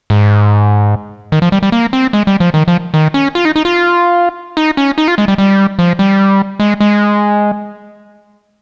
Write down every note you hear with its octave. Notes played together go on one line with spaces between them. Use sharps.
G#2
D#3
F3
G3
G3
A#3
C4
G#3
G3
F3
D#3
F3
D#3
C#4
F4
D#4
D#4
F4
D#4
C#4
D#4
F4
G#3
G3
G3
F3
G3
G#3
G#3